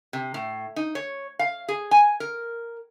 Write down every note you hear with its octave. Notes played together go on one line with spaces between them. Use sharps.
C3
A2
D#4
C#5
F5
G#4
G#5
A#4